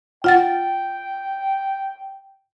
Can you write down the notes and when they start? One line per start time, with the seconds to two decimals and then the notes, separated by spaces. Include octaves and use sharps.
0.24 F4 F#5 G5 A6